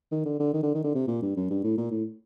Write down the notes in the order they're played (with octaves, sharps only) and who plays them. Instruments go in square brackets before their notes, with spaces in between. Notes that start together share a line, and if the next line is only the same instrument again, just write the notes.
[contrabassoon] D#3
D3
D3
D#3
D3
D#3
D3
C3
A#2
G2
F#2
G2
A2
A#2
A2